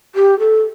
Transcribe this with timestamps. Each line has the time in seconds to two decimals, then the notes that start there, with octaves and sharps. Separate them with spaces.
0.15 G4
0.39 A4